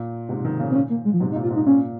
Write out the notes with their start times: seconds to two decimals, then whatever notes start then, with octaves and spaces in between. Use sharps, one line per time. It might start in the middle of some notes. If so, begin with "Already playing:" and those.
Already playing: A#2
0.29 G#2 C3
0.45 C3 D#3
0.59 A#2 C#3
0.70 C4
0.75 C#4
0.90 A#3
1.05 G#3
1.14 F3
1.20 G#2 C3 F#3
1.32 D#4
1.36 A#2
1.43 F4
1.50 G#2
1.55 D#4
1.66 A#2 C#4